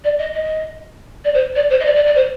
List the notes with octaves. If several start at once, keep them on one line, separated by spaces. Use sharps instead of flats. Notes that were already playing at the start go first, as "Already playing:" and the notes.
D5
D#5
D#5
D5
C5
D5
C5
D#5
D5
D5
D5
C5